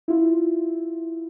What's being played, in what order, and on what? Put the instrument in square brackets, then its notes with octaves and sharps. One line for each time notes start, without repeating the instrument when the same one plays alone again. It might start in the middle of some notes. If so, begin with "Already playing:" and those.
[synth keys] E4 F4